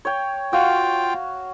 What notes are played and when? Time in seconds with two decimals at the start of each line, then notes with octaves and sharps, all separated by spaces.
0.05 C#5 G5
0.53 F4 F#4 F5 G5